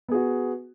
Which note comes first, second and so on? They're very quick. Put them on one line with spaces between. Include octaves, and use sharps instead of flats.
B3 G#4 F#4